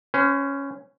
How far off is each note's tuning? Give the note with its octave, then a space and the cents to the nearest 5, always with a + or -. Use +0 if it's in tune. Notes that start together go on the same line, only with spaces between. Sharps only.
C#4 +0 C5 -45